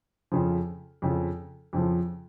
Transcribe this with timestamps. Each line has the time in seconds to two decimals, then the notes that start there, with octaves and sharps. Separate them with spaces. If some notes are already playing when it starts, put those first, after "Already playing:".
0.32 F2 C#3 F3
1.02 F2 C#3 F3
1.73 F2 C#3 F3